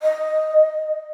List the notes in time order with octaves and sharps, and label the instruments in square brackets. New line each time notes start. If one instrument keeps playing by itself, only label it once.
[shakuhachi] D#5